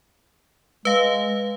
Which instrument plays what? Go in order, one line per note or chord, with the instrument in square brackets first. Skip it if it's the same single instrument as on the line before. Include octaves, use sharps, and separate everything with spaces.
[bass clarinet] G#3 [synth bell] B4 F5